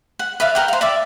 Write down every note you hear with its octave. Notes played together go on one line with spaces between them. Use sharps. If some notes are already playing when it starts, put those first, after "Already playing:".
F#5
B4 D5 E5 F5
A#4 F#5 G5
C5 F5
D5 E5 D6